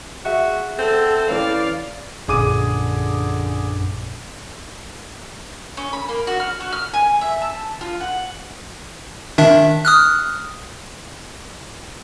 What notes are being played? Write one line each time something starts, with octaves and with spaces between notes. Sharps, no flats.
F#4 G#4 E5 F#5
C4 A4
E3 C#4 B4 D5 F5
A#1 F#2 D3 G#4 D6 D#7
C#4
B5
A#3
F#4
F6
F#4
F6
G#5
E5
A5
F4
F#5
D#3 D4 E5
D#6 F6 F#6